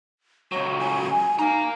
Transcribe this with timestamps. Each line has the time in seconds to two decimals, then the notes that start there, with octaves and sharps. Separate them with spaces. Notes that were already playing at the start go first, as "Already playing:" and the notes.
0.52 C#2 F#3 C#5
0.79 G#5
1.39 D#4 F5 A#5